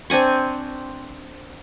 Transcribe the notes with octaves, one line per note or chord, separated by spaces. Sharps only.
C4 D4 G#5 C#6